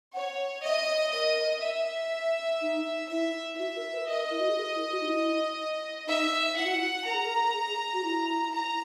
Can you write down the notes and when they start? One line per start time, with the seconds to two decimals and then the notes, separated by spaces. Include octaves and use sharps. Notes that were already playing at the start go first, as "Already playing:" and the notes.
0.14 C#5 F#5
0.63 D#5 E5
1.13 A#4 D#5
1.62 E5
2.61 D#4
3.10 E4 E5
3.54 E4
3.59 F#4 E5
3.76 A#4
3.93 B4
4.08 A#4 D#5
4.30 E4
4.40 F#4
4.49 G#4
4.59 A#4
4.75 E4
4.92 F#4
5.01 D#4
5.07 E4
6.06 D#4 E5
6.56 E4 F#5
6.65 F#4
6.75 E4
7.05 A#4 A#5
7.14 G#4
7.24 A#4
7.54 G#4
7.93 F#4
8.04 E4
8.53 A#5